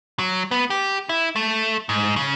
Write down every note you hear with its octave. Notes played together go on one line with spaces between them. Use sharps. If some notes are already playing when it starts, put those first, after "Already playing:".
F#3
B3
G4
E4
A3
G#2
C#3